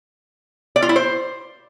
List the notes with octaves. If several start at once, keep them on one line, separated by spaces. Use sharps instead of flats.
D5
F4
E4
C5